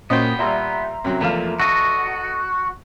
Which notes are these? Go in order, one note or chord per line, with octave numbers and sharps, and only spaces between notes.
A#2 A#3 B3 C#4 F#4 C5 D#5 G5
A#2 G3 E5 A#5 C6
F#2 C3 F#3
E2 F3 A3 A#3 F5
F#4 A4 D#5